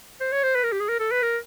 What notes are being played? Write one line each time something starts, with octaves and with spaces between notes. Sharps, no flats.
C5
C#5
C5
B4
A#4
G4
G#4
A#4
A4
B4
A#4